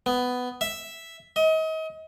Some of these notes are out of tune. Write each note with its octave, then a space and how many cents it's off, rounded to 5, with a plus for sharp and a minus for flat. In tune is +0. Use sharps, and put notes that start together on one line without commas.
B3 +10
E5 +0
D#5 +35